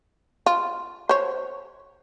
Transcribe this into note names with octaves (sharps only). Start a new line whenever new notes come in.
F4
C5 C#5